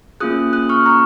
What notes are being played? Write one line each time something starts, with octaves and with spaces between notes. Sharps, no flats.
A#3 C#4 F4 G#4 D#6 F#6
D#6 F#6
C#6 F6
A#5 C#6